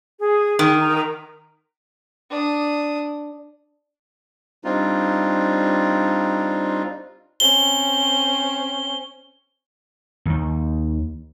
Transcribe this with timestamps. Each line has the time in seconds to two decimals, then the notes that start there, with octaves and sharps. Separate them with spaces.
0.20 G#4
0.59 D#3
0.80 A#5
2.30 D4 D#6
4.64 G3 C4 D4 D#4 F4
7.40 C4 C#4 G7
10.25 D#2 D#3